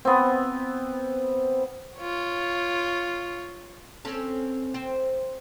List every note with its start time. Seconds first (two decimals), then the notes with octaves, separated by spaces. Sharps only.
0.05 B3 C4
1.97 F4 C#5
4.05 C4 C#4 A4
4.74 C4